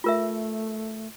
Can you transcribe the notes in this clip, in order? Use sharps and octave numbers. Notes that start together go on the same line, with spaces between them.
A3 F4 A#4 E5